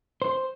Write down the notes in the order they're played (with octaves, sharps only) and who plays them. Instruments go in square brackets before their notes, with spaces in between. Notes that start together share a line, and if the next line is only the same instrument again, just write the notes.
[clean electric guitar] C5